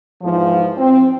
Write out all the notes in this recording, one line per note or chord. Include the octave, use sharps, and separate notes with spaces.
E2 G#2 F3
C4